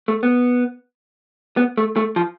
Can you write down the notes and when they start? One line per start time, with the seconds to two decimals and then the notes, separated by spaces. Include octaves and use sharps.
0.08 A3
0.23 B3
1.57 B3
1.78 A3
1.96 A3
2.16 F3